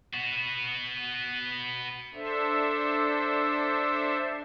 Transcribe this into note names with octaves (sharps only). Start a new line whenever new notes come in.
B3 F#4
D4 A4 C5 E5